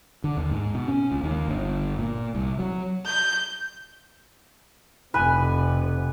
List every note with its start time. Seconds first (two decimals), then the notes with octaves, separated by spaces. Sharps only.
0.24 D3
0.37 D#2
0.51 G#2
0.75 B2
0.88 C#4
1.11 C#2
1.23 D#2
1.48 G1
1.99 A#2
2.35 C2
2.59 F#3
3.05 G6
5.14 F1 C3 B4 G#5